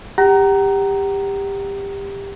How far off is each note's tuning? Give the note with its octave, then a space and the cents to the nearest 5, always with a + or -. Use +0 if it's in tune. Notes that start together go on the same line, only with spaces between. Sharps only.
G4 +20 F#5 +40 A#5 +0